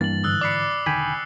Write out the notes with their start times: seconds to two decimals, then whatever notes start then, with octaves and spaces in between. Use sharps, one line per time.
0.01 G2 E3 A#3 A6 F#7
0.24 G#2 D3 E3 D#6 E6 F#6
0.41 D5 B5 D6 C7 C#7
0.86 E1 D3 D#3 G5 G#5 B5